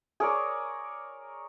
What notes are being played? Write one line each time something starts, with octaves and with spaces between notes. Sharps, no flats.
G#4 A#4 C#5 D5